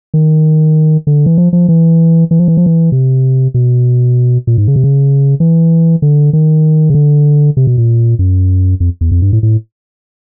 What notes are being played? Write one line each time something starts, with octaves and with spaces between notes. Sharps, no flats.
D#3
D3
E3
F3
F3
E3
E3
F3
E3
F3
E3
C3
B2
A#2
G#2
C#3
C3
C#3
E3
D3
D#3
C#3
D3
C3
B2
A#2
F#2
F2
E2
F2
G2
A2
A2